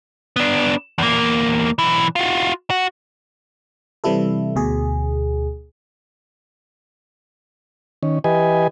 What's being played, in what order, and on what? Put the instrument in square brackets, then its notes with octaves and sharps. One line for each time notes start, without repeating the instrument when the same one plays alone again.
[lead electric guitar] B3 D4
E2 A#3
B1 E3
F4 F#4
F#4
[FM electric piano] C3 E3 G3 E4 A4
D2 B2 G#4
[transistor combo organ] D#3 C#4
E3 G4 B4 D#5 G#5